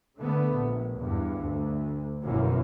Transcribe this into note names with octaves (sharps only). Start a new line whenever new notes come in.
D3 A3 B3
A#1
E2 G2
D2
G1 F#2 B2 E3 A#3